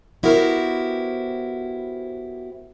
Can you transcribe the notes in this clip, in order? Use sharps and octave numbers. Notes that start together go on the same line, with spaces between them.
B3 E4 F#4 G4 A#4 C5